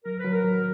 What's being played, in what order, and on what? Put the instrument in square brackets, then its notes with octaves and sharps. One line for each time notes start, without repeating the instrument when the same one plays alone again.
[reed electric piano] F#3 [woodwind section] A#4
[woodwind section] B4
[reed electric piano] F#3
[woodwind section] A#4
[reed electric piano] F#3